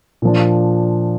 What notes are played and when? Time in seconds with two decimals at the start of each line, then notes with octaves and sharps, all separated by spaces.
0.22 A#2 F3 D4